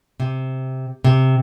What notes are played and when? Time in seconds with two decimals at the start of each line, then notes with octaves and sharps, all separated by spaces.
0.20 C3
1.04 C3